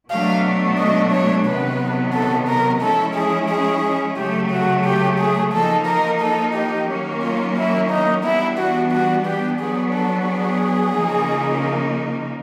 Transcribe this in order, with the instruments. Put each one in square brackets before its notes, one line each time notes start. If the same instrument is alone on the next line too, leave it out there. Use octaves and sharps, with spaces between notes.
[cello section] B2 F#3 A3 D4 [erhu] F5
[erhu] D#5
C#5
[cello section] C3 D#3 F#3 B3 [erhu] B4
[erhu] A4
A#4
[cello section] F3 G#3 C#4 E4 [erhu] A4
[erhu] G#4
G#4
[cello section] C#3 F#3 A3 [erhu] G4
[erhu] F#4
G4
G#4
[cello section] F3 A#3 D#4 [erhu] A4
[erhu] A#4
A4
G4
[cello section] D#3 F#3 A#3 C#4
[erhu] F4
E4
D#4
[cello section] E3 G3 B3 D4 [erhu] E4
[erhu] F#4
F#4
G4
[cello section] F#3 B3 D4 [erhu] G#4
[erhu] A4
G#4
[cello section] C#3 F3 A#3 D#4